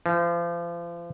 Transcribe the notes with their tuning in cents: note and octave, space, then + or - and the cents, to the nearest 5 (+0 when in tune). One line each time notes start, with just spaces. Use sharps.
F3 -35